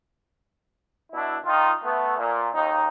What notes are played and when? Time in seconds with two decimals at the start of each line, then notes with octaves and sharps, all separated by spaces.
1.13 B2 D4 E4
1.45 D#3 D#4 F4
1.84 A3 B3
2.17 A#2
2.54 D#2 C#3 D#4